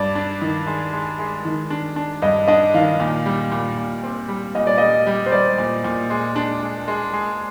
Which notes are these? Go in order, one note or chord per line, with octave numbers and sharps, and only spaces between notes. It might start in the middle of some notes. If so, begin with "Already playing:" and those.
Already playing: G2 D5
D4
D#3
G#3
G#3
G#3
D#3
D4
D4
G2 D#5
D4 D#5
D#3 F5
A#2
G3
A#2
A#2
C4
G3
A#2 D#5
D5
G3 D#5
G3
C5
G3 D5
A#2
A#2
G#3
D4
G#3
G#3
G#3